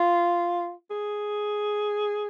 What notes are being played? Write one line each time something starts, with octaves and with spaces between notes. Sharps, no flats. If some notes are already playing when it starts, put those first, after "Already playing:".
Already playing: F4
G#4